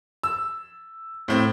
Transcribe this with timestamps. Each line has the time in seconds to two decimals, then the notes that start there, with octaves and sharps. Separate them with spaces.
0.23 E6
1.28 A2 C4